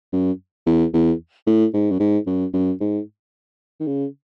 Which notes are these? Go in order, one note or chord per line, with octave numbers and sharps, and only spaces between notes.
F#2
E2
E2
A2
G#2
F#2
G#2
F#2
F#2
G#2
D#3
C#3